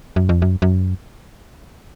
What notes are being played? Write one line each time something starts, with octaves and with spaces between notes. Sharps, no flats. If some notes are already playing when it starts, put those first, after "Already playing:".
F#2
F2
F#2
F#2